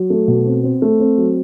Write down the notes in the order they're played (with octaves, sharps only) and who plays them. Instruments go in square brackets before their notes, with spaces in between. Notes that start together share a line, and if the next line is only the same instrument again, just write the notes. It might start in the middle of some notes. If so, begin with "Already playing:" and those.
Already playing: [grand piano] F#3
A3
B2
C4
C4
A3
C4
F#3